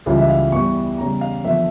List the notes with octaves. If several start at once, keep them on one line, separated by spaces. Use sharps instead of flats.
C#2 C#3 E3 G3 F4
E5
F5
E2 E3 G3 C#6
E2 C#3 G3 A#5
F5
E2 D3 F3 E5